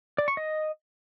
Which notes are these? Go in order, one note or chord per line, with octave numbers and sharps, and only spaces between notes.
D5
C#6
D#5